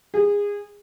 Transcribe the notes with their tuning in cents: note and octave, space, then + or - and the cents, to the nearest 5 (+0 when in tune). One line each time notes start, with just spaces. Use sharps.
G#4 -25